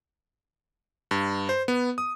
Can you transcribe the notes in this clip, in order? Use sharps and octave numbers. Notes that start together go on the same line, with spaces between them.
G2
C5
B3
D#6